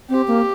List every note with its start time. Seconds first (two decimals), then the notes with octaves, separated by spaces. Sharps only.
0.09 C4 G4
0.28 A#3